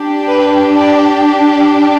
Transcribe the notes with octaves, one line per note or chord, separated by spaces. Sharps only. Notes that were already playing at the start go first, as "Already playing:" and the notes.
Already playing: D4 G4
B4
D5